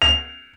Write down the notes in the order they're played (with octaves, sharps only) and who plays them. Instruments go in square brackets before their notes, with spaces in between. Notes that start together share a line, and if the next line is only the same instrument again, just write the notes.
[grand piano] F7